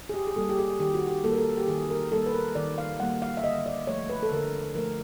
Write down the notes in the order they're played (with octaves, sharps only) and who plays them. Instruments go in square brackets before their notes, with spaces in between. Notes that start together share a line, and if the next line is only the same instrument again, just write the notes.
[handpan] G#4
G4
G#4
G3 A#3 A4
G4
G#4
D#3 G4
F#4
G4
G3 A#3 A4
A#4
A4
G4
D#3 G#4
A#4
G3 A#3 A4
B4
A#4
D#3 D5
F5
G3 A#3 F#5
F5
E5
D3 D#5
D5
F3 A3 C#5
B4
A4
D3 A#4
F3 A3 A#4